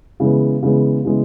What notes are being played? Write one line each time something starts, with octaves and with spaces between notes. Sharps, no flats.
C#3 E3 G#3 B3
C#3 E3 G#3 B3
C#3 E3 G#3 B3